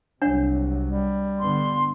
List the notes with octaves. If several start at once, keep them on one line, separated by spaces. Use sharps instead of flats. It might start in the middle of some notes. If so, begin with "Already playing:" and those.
C2 C3 F#3 D4 C#5 F#5
G3
G2 D3 B3 C6